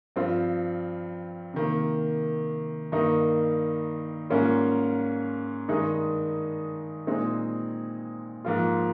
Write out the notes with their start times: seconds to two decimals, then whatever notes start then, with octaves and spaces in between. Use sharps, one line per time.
0.16 G2 F3 C4 F4
1.54 C3 D#3 A#3
2.92 G2 D#3 A#3 D#4
4.30 G#2 G3 A#3 C#4 F4
5.68 G2 D#3 G#3 D#4
7.07 A#2 G#3 C4 D#4
8.45 G#2 F3 A#3 F4